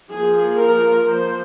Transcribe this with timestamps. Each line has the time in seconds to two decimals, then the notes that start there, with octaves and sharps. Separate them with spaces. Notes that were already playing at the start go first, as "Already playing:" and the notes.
0.10 F3 A#3 G#4
0.58 A#4
1.07 F3 A#3 C5